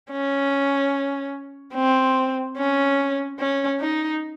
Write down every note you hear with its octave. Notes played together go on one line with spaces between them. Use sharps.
C#4
C4
C#4
C#4
D#4